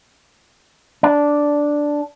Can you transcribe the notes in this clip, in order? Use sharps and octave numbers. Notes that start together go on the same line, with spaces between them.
D4